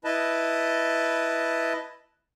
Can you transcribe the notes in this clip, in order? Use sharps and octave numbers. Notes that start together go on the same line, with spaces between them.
E4 B4 D#5 A5